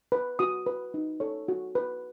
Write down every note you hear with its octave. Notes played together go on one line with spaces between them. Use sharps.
B4
F#4 D#6
B4
D#4
A4 C#5
F#4
B4